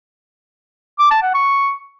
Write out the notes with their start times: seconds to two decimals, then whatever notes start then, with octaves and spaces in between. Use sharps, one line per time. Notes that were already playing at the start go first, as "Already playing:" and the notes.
0.99 D6
1.11 A5
1.22 F#5
1.34 C#6